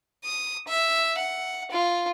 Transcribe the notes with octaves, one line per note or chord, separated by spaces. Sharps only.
D#6
E5
F#5
F4